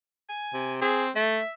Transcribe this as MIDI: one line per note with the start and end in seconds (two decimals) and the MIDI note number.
0.29 0.73 80
0.53 0.78 48
0.81 1.10 60
0.81 1.04 68
1.16 1.40 57
1.16 1.50 76